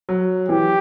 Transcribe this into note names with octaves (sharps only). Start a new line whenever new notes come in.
F#3
E3 G4